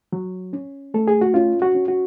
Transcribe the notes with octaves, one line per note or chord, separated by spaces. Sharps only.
F#3
C#4
A3 A4
G#4
F#4
C#4 F4
F#4
C#4
F#4